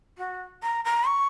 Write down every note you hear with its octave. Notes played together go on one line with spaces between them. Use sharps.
F#4
A#5
A#5
C#6